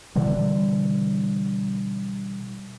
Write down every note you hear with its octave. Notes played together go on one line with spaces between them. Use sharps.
B2 D3 E3 G3